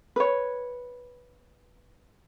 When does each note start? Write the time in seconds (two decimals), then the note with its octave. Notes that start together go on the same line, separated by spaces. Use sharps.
0.16 B4 C#5